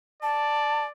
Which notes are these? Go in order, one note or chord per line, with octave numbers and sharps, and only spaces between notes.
D5 A5